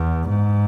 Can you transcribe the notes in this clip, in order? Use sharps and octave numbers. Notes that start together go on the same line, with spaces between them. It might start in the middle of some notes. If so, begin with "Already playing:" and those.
Already playing: E2
G#2